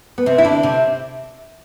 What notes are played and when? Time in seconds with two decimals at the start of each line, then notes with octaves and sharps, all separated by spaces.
0.18 B3
0.26 C3 C4
0.38 E4
0.44 D3 D4
0.63 C3 C4